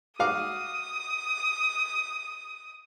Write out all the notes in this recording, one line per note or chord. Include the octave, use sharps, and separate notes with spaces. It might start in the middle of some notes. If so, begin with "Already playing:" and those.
F#4 F5 D6 D#6